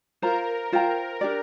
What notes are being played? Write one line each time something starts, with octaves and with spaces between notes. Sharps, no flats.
F4 A#4 C5 A#5
F4 C5 G5 A#5
D4 G4 D5